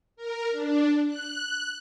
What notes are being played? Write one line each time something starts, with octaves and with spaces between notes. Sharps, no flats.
A#4
D4
F#6